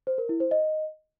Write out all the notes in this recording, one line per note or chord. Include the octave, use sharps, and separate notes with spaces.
C5
A#4
E4
C5
D#5